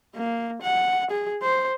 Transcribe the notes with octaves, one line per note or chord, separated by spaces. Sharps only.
A#3
F#5
G#4
C5